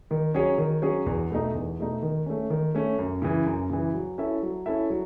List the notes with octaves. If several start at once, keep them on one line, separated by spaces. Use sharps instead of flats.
D#3
F#3 C#4 G#4 C#5
D#3
F#3 C#4 G#4 C#5
E2
B2 A3 D#4
E2
B2 A3 D#4
D#3
A3 C#4
D#3
A3 C#4
F#2
C#3 E3
F#2
C#3 E3
F#3
C#4 E4 A4 E5
F#3
C#4 E4 A4 E5
F#3